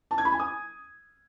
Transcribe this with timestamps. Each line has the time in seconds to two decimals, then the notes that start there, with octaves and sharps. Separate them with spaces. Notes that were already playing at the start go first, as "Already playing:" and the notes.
0.11 A5
0.18 G#6
0.25 B5
0.32 G#5
0.39 D#6